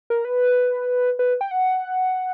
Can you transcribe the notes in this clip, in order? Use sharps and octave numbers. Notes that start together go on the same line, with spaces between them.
A#4
B4
B4
G5
F#5